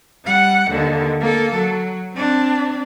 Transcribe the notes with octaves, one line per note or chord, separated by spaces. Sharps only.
G3 F#5
D#2 D3
A#3 A4
F#3
C4 D4